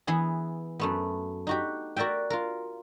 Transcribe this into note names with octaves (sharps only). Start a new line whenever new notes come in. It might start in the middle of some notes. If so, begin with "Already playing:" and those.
E3 B3 G#4
F#2 A3 B3
D#4 F#4 G4
F#4 A#4 D5 E5 G5
F4 A#4